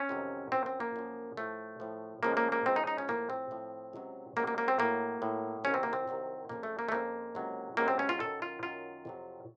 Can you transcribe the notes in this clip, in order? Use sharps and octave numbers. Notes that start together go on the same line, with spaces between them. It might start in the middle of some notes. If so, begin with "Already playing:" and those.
Already playing: C#4
F2 C3 D#3 F#3
F#2 F3 C4
C4
A#3
F#2 F3
A2 F3 A3
A2 F3
C#2 C#3 F3 A#3
A#3
A#3
C#2 C#3 F3 C4
D#4
D#4
C#4
A2 F3 A#3
C4
A2 F3
C#2 C3 F#3
C#2 C3 F#3 A#3
A#3
A#3
C4
A2 F#3 A#3
A2 F#3
C2 C3 D#3 F#3 C#4
C4
A#3
C4
C2 C3 D#3 F#3
F2 C#3 F3 A#3
A3
A#3
A3
F2 C#3 F3 A#3
C#2 C3 F#3
C#2 C3 F#3 A#3
C4
C#4
F4
F#2 D#3 F#3 A4
F4
F#2 D#3 F#3 F4
F2 C3 F#3